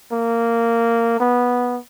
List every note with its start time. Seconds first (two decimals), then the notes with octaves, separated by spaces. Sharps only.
0.12 A#3
1.20 B3